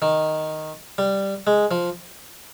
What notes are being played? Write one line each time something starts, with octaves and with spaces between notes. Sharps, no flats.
D#3
G3
G#3
F3